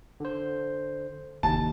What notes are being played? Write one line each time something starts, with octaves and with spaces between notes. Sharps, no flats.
D3 C5
F1 D#2 A5